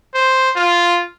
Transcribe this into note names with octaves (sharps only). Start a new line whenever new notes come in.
C5
F4